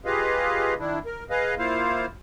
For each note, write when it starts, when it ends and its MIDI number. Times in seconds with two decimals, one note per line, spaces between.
0.05 0.74 65
0.05 0.74 67
0.05 0.74 68
0.05 0.74 71
0.05 0.74 75
0.05 0.74 77
0.79 0.99 51
0.79 0.99 62
0.79 0.99 64
1.06 1.24 70
1.30 1.55 68
1.30 1.55 71
1.30 1.55 75
1.30 1.55 77
1.58 2.06 58
1.58 2.06 64
1.58 2.06 65
1.58 2.06 72
1.58 2.06 77